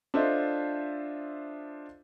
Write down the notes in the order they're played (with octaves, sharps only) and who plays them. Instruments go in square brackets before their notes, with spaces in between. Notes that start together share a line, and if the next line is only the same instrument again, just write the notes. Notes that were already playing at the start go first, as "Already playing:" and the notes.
[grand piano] D4 F4 A4 C5 D#5 E5